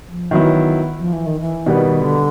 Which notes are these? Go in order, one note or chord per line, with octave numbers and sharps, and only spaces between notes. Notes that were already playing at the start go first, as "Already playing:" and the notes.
F3
D#3 E3 F#3 B3 E4
F3
E3
D#3
E3
B2 D#3 G3 B3
D3